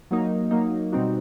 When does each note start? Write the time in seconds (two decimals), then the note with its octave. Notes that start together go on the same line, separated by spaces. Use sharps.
0.11 F#3 A#3 D#4
0.51 F#3 A#3 D#4
0.92 B2 G3 C4 D#4 F#4